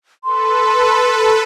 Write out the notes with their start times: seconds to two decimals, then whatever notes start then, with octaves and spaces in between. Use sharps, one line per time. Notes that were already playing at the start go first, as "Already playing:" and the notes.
0.24 A4 B4 C6